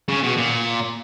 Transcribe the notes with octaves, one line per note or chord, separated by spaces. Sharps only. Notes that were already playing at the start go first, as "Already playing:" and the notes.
C#3
B2
A#2